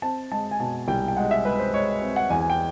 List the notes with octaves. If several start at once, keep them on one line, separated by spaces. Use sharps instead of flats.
C4 A5
G#3 A5
G#5
B2 A5
C2 G5
G5
G#3 F#5
E5
G#3 B4
C5
G#3 C#5
C4
F#5
E2 G#5
G#5
G5